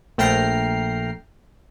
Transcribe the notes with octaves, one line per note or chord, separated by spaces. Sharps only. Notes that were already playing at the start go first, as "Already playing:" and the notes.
A#1 A3 G5 A#5 F6 C7